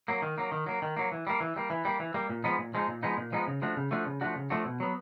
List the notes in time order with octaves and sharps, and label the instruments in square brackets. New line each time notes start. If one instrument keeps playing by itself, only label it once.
[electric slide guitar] F#3 A#3
D#3
F#3 A#3
D#3
F#3 A#3
D#3
F#3 A#3
E3
G3 A#3
E3
G3 A#3
E3
G3 A#3
E3
G3 A#3
A#2
F3 G#3 B3 D#4
A#2
F3 G#3 B3 D#4
A#2
F3 G#3 B3 D#4
A#2
F3 G#3 B3 D#4
C#3
F3 A3 D4 F#4
C#3
F3 A3 D4 F#4
C#3
F3 A3 D4 F#4
C#3
F3 A3 D4 F#4
B2
F#3 B3